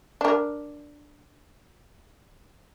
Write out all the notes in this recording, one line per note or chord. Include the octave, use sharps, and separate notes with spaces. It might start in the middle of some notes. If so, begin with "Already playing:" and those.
D4 A#4